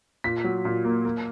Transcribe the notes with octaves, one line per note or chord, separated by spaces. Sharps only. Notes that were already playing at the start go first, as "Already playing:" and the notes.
A#2 B6
F#3
A#2
A#3
A#3